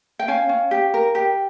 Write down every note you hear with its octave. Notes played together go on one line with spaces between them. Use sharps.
G5
C#4 F5 G#5
C#4
G4
A#4
G4